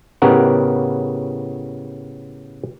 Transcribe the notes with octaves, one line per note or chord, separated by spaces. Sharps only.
A2 C#3 B3 G4 A#4 F#5